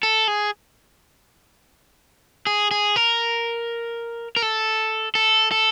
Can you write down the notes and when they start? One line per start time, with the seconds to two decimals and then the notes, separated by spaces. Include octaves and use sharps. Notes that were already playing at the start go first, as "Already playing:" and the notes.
0.03 A4
0.28 G#4
2.47 G#4
2.71 G#4
2.96 A#4
4.37 A#4
4.42 A4
5.15 A4
5.51 A4